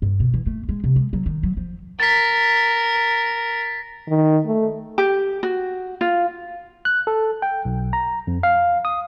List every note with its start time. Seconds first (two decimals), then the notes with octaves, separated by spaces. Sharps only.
0.02 G2
0.20 B2
0.34 E3
0.47 A3
0.69 G#3
0.84 C3
0.96 G#3
1.13 F#3
1.26 D#3
1.43 F#3
1.57 F3
2.00 A#4 A6 B6
4.08 D#3
4.47 A3
4.98 G4
5.43 F#4
6.01 F4
6.85 F#6
7.07 A4
7.42 G5
7.65 B1
7.93 A#5
8.27 F2
8.43 F5
8.85 D#6